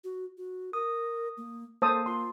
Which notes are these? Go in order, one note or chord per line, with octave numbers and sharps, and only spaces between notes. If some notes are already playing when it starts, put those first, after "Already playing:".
F#4
F#4
A#4 D#6
A#3
A#3 A4 C5 A5 D#6
F4 C6